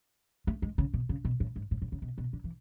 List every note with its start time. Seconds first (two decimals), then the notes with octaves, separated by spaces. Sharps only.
0.47 A3
0.62 G#3
0.78 C#3
0.94 B2
1.09 C#3
1.25 B2
1.40 A2
1.56 G#2
1.71 A2
1.82 A2
1.92 C#3
2.02 B2
2.18 B2
2.33 D3
2.44 E3